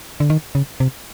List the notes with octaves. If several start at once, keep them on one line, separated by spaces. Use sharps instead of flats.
D3
D#3
C#3
C3